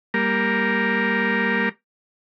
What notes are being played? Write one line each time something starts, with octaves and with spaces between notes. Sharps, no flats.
G3 A#3 A#4